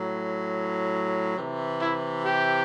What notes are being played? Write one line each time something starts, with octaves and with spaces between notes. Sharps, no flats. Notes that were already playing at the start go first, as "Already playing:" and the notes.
Already playing: A2 F#3
C3 E3
E4
G4